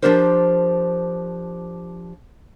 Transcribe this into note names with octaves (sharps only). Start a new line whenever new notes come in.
F3 B3 D4 G4 A#4 C5